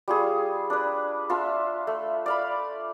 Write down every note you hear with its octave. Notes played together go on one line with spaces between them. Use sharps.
G3 F4 G#4 C#6
D4 B4
F4 E5 F5 A5
A3
D5 F5 B5